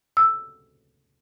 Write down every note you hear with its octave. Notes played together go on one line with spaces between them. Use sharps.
E6